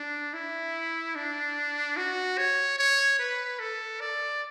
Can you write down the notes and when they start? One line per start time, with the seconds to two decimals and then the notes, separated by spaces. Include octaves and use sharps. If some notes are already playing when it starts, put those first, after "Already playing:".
Already playing: D4
0.34 E4
1.16 D4
1.97 F#4
2.38 C#5
2.79 C#5
3.19 B4
3.60 A4
4.00 D5